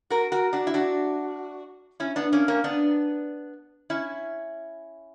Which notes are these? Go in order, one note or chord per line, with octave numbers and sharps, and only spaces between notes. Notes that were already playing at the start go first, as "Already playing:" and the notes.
F#4 A#4
F#4 A#4
D4 F#4
E4
D4 F#4
C#4 E4
B3 D4
A#3 C#4
A#3 C#4
B3 D4
C#4 E4